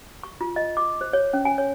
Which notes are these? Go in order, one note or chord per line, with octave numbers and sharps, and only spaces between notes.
C#6
F4
D#5
D6
C5
C#5
C#4
G#5
C#5